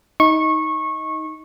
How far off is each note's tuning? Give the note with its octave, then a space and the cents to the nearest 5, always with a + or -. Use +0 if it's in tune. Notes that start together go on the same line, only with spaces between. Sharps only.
D#4 +20 C#6 -20